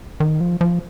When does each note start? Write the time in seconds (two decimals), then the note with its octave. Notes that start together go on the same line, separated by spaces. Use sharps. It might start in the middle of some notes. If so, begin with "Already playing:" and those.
0.20 D#3
0.41 F3
0.61 F3